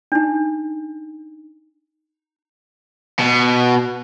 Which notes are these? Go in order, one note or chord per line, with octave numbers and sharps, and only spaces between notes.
D4 D#4
B2